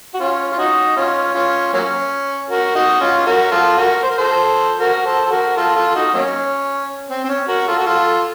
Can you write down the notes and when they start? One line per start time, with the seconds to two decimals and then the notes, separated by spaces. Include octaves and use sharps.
0.14 F#4
0.20 C#4 F4
0.51 F4
0.58 D#4 F#4
0.96 C#4 F4
1.35 C#4 F4
1.74 F#3 A#3 C#4
2.50 F#4 A#4
2.75 D#4 F#4
3.01 C#4 F4
3.26 F#4 A#4
3.51 F4 A4
3.77 F#4 A#4
4.03 C5
4.10 A#4
4.18 A4 C5
4.80 F#4 A#4
5.05 A4 C5
5.26 A4
5.30 F#4 A#4
5.56 F4 A4
5.75 F4 A4
5.91 A4
5.95 D#4 F#4
6.14 F#3 A#3 C#4
7.09 C4
7.24 C4
7.29 C#4
7.48 F#4 A#4
7.67 F4 A4
7.79 F#4
7.86 F4 A4